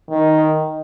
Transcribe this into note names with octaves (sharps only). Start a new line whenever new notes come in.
D#3